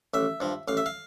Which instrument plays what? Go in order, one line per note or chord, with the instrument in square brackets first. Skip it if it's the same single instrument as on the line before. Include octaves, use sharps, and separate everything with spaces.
[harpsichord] A1 E5
G2 F3
A1 F5
E5
F5